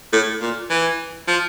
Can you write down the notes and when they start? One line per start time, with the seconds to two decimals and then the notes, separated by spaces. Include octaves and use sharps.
0.12 A2
0.41 A#2
0.70 E3
1.28 F3